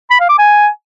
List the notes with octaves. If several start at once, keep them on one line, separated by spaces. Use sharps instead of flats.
B5
F5
D6
G#5